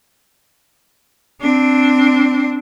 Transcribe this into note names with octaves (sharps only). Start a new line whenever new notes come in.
C4 D4